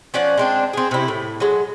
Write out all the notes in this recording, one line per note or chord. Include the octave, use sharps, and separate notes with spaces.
F3 C#4 D5 F#5
G#3 C4 D4
C4 G#4
C3 E4
A2
F#3 G#3